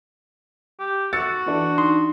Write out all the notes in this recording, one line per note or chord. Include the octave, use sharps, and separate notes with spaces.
G4
F#4 E6 A6 C#7
E3 D4
D#4 C6